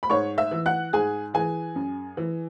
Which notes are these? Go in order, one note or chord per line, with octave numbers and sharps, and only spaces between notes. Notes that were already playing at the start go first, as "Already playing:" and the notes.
B5
G#2 C#5 C#6
E5 E6
E3
F#5 F#6
G#2 G#4 G#5
E3 G#4 G#5
F#2
E3